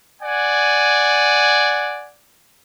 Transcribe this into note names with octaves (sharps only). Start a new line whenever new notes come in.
D5 F#5 G#5